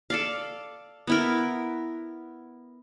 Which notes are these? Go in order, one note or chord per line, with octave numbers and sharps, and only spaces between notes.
A4 D5 F5
B3 E4 A#4